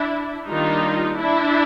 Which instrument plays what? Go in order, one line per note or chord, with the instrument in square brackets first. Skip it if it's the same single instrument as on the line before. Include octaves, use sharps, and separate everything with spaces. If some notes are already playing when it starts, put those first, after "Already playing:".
Already playing: [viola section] D4 E4
D#3 G3 A#3 D4 D#4 F4
D4 E4